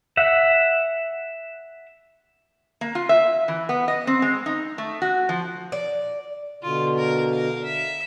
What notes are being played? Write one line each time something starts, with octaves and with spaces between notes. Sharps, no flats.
E5 F#5
A#3
F4
E5
E3
B3
D#5
C4
G#3
D#4
A3
F#4
F3
D5
B2 D3 F4
A#4
A#4 F5
E5